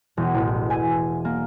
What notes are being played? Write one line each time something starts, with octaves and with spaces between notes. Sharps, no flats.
E1
A1
G#5
A#3